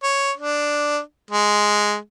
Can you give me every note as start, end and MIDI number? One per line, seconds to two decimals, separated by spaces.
0.03 0.31 73
0.37 1.00 62
1.31 1.96 56